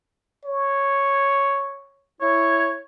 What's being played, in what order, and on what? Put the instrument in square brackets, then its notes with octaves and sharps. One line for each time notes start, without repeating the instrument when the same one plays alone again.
[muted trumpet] C#5
[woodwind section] E4 C#5